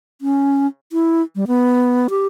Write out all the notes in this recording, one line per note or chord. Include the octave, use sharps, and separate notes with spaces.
C#4
E4
G3
B3
G4